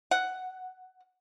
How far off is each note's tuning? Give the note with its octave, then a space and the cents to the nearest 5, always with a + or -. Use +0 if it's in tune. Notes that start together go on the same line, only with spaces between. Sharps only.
F#5 +5